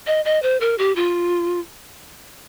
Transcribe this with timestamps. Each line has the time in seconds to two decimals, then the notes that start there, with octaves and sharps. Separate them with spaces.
0.07 D#5
0.25 D#5
0.43 C5
0.61 A#4
0.78 G4
0.96 F4